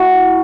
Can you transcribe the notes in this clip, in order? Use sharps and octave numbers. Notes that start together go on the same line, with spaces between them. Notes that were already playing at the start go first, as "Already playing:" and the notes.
Already playing: A3 E4 F#4